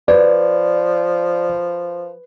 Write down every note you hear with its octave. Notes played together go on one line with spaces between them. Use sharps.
F3 B4 D5